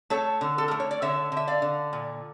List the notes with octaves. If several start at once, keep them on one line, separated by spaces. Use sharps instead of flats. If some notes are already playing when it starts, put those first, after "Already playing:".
A3 A4 C#5
D3
A4
A3 A#4
C#5
D5
D3 C#5 E5
D3 E5
D5 F5
D3
A#2